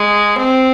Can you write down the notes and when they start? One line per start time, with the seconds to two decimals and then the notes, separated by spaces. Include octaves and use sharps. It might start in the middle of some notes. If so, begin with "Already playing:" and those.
Already playing: G#3
0.38 C4